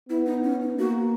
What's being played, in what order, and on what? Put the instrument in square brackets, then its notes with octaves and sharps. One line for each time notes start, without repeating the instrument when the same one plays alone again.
[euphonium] B3 [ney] E4
[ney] D#4
C#4
D#4
[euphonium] A#3 [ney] F#4